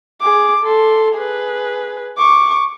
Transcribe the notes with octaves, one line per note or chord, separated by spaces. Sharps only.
G#4 D6
A4 C6
G#4 B4
C#6 D6